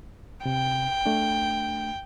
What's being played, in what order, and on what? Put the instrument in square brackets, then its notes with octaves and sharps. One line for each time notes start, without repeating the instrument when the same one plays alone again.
[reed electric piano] C3 [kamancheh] G5
[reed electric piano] A3 D4